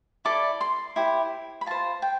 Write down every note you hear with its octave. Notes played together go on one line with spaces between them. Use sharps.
E4 A4 D5 D6
C6
E4 G4 C5
B5
F4 C5 A5
G5